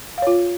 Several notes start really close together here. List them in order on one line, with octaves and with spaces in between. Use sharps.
F5 C#5 F4